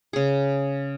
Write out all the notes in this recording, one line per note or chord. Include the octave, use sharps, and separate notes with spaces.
C#3 G#4